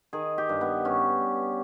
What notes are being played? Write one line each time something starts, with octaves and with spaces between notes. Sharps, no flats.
D#3 G#4
G4
G2
B3
G2 C#4
G2